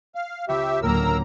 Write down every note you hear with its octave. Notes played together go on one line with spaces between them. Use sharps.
F5
C#2 G4 C#5 E5 B5
D2 A2 F#3 A#3 A#4 A#5 E6